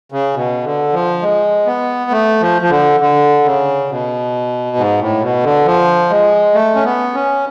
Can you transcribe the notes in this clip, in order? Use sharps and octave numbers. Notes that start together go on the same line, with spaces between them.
C#3
B2
D3
F3
G#3
B3
A3
F3
F3
D3
D3
C#3
B2
G#2
A2
B2
D3
F3
G#3
A3
C#4
B3
C#4